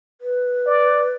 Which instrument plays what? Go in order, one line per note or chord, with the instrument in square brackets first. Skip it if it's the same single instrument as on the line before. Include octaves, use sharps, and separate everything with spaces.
[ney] B4
[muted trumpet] D5